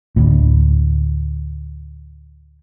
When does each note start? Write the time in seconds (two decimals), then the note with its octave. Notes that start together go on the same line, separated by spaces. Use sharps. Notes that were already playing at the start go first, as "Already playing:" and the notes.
0.16 D2 A2